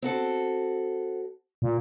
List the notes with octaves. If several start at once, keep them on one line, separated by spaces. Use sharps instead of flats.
C4 F#4 A4
A#2